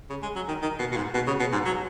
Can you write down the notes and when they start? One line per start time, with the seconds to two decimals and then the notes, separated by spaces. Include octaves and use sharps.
0.10 C#3
0.23 G#3
0.36 F#3
0.48 D#3
0.62 D#3
0.79 B2
0.92 B2
0.96 G#2
1.14 B2
1.27 C#3
1.40 B2
1.52 G#2
1.66 F#3